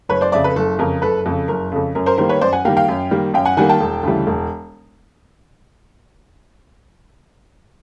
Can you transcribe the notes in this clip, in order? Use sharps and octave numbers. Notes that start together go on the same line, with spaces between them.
F#1 B4 C#5
C5 D5
F2 C#3 D5 E5
A4 B4
F#1 A4
F2 C#3 A#4
F#1 A4 B4
F2 C#3 A4
F#1 A#4
F2 C#3 A4
F#2 A#4
A#4 C5
D#3 G3 A#3 A#4 C5
B4 C#5
F#2 C5 D5
F#5 G#5
D#3 G3 A#3 F5 G5
F5 G5
F#2
D#3 G3 A#3
F#2 F5 G5
F#5 G#5
D#3 G3 A#3 F#5 G#5
G5 A5
E1
D2 C#3 E3 G3
E1